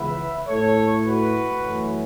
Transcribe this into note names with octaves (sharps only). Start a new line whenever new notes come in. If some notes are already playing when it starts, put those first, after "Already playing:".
Already playing: C#2 C#3 E3 B3 B4 E5
A2 A3 E4 A4 C#5
F#4 B4
F#2 E3 A3 C#4 E4